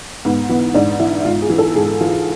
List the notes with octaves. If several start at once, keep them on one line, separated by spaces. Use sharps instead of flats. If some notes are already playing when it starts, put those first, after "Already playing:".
G#2 B3
E3 B3
G#2 D4
E3 E4
G#2 F4
G#4
E3
A4
G#2 G#4
E3 F4